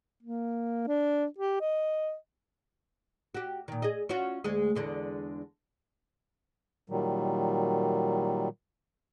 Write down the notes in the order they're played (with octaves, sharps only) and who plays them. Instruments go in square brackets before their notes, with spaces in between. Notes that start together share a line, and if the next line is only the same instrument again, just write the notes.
[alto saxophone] A#3
D4
G4
D#5
[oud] F#4 G4
A#2 D#3
G#4 D#5
C#4 F4 F#4
D2 G#3 G#4
E2 D3 G#3
[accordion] A#2 D#3 F#3 G3